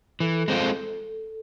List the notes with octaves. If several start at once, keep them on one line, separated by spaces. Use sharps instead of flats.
E3 A4
G#3 C4 F4